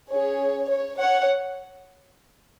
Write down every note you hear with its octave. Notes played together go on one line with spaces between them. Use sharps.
C#4 G#4 C#5
C#5
C#5 F#5